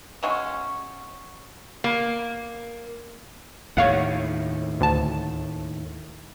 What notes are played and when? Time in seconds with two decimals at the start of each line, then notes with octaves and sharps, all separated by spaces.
0.23 C#3 F#3 G#3 C#4
1.84 A#3
3.77 D#2 A2 C#5 F5 F#5
4.80 D2 A5